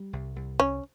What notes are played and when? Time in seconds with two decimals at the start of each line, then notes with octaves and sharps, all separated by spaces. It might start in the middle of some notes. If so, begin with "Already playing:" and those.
Already playing: G3
0.13 C2
0.36 C2
0.59 C2 C#4